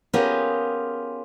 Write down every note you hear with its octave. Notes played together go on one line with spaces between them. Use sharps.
B3 C#4 F4 G4 G#4 A#4